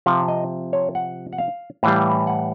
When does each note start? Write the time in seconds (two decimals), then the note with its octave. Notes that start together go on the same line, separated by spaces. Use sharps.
0.06 C3 F3 F5
0.28 D#5
0.73 C#5
0.95 F#5
1.33 F#5
1.38 F5
1.83 A2 E3 G3 F5
2.27 F#5